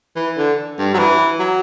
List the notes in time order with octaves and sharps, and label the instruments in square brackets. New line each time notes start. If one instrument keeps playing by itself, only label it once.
[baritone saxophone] E3
D3
G2
F#3
E3
F#3